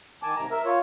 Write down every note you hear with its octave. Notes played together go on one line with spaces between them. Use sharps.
D#3 G#5 A5 D6
G#2 C3 A#5
A#4 E5
F4 C#5